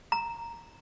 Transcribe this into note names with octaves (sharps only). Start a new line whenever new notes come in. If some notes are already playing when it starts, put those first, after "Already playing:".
A#5